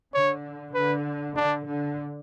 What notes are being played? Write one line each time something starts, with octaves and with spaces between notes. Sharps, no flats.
D3 C#5
D3 B4
D3 D4
D3